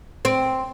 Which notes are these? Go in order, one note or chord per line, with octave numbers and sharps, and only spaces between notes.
C4